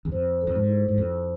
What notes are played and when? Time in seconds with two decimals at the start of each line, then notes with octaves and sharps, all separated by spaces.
0.05 E2
0.12 F2 C5
0.41 A4
0.47 F2
0.55 G#2
0.69 E4
0.88 G#2
0.98 F2 A4